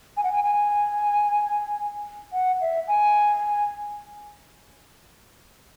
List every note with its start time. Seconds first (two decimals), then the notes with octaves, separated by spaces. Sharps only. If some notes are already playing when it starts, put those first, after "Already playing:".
0.17 G#5
0.24 F#5
0.32 G#5
0.44 G#5
2.33 F#5
2.61 E5
2.88 G#5